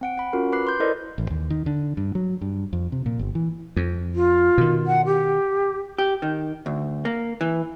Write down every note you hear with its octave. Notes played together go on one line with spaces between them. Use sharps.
C4 F#5 D7
F#5 B5
C#4 F4 F#4 A#4
B4 B5 D6 F#6 C7
B4 C6 G6
E4 A4 A#4 C5 D5 D#5
A1
D#2
D#3
D3
G2
F#3
G2
F2
C3
A#2
G1
E3
F2
F4
B2 D#3
F#5
G4
G4
D#3
D2
A#3
E3